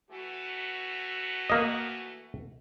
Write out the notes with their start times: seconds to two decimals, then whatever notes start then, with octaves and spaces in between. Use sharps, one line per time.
0.10 E3 A3 F#4
1.50 A#3 D#5